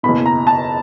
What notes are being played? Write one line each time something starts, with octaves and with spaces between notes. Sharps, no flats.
F#1 E2 B2 B5
A#5
A5